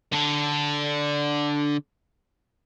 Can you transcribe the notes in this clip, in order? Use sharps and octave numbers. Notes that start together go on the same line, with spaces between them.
D3 D4